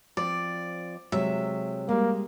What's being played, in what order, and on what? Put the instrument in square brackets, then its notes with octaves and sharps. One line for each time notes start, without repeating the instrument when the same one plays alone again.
[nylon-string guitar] F3 C4 [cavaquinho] D5
[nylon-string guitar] C3 F#3 G#3 [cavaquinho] E5
[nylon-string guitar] G3 G#3 [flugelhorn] A#3